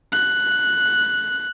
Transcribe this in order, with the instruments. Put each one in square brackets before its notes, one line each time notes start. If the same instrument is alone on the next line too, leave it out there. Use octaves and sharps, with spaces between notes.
[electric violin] F#6